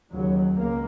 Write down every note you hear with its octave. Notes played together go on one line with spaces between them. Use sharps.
D#2 C#3 F#3
C#2 A#3